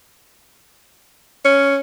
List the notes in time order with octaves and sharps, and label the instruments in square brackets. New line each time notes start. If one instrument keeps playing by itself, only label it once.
[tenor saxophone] C#4